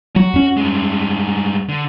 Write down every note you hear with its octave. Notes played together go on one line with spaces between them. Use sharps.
F#3 F#4
F2 C#4
G2 G#3
D3